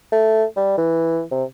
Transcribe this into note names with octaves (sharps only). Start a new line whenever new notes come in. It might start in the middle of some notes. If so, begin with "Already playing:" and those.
A3
G3
E3
C3